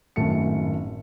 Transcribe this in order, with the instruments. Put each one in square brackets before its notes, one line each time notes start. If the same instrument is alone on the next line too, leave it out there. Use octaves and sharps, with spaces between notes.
[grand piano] G#1 F#2 A2 A3 A5 C#7